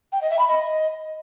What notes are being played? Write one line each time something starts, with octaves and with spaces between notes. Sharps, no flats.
G5
D#5
E5
B5
D#5